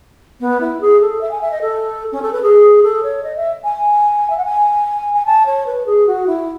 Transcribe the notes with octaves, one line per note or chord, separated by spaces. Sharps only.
B3
E4
G#4
A4
E5
G#5
E5
D#5
A4
C#4
A4
B4
G#4
A4
C#5
D#5
E5
G#5
E5
F#5
G#5
G#5
A5
C#5
B4
G#4
F#4
E4